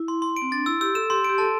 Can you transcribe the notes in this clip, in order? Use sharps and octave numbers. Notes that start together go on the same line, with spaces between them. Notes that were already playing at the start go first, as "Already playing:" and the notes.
Already playing: E4
C6
C6
D7
C4
D4 A6
E4 E6
G4 E6
A4 E7
G4 C6
G4 D7
A4 A5